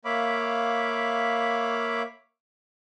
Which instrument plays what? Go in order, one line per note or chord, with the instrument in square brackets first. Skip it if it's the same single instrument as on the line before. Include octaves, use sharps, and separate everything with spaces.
[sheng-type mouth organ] A#3 C#5 E5 F5 B5 D6